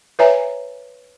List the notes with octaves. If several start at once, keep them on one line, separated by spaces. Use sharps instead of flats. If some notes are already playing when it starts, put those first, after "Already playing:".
B4 C#5 E5 G#5 A#5